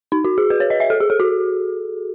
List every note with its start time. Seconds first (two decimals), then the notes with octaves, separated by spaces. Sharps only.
0.12 D#4
0.25 F#4
0.38 G#4
0.50 B4
0.60 C#5
0.70 D#5
0.80 E5
0.90 A4
1.00 G#4
1.10 A4
1.20 F#4